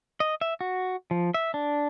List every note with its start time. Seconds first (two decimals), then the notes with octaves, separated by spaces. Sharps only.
0.20 D#5
0.41 E5
0.61 F#4
1.11 F3
1.34 E5
1.54 D4